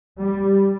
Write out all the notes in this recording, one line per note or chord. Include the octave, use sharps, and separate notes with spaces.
G3